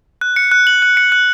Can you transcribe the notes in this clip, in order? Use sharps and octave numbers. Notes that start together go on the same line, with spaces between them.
F#6
C#7
F#6
F#7
F#6
C#7
F#6